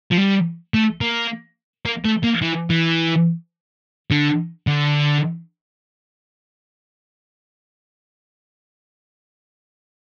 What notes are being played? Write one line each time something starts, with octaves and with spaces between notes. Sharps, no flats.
F3
G3
A3
A#3
A#3
A3
A#3
E3
E3
D3
D3